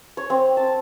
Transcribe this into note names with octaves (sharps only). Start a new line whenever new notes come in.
C#5
C4
A5